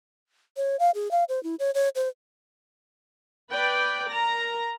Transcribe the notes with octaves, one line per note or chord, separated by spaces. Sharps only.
C#5
F5
G#4
F5
C5
E4
C#5
C#5
C5
B4 D5 G5
A#4 A#5